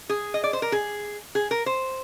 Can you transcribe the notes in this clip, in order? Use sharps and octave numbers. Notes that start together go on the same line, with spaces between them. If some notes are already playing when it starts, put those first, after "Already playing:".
G#4
D#5
D5
C5
A#4
G#4
G#4
A#4
C5